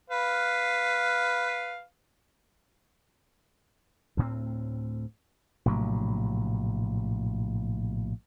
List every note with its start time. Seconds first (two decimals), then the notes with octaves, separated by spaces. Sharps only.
0.10 B4 F5
4.17 D2 A2 A3 C4
5.66 A#1 A2 C3 F#3